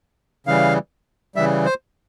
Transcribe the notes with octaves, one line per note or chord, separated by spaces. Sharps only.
C#3 E3 G3 F5
C#3 E3 G3 E5
C5